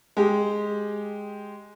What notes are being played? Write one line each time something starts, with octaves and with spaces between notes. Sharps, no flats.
G#3 G4